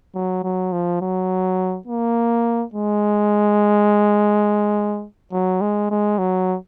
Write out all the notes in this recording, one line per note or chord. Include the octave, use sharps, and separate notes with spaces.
F#3
F#3
F3
F#3
A#3
G#3
F#3
G#3
G#3
F#3